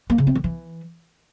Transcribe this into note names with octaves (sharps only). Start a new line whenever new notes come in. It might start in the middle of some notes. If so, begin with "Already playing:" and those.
A#3
C#3
C4
D#3
E3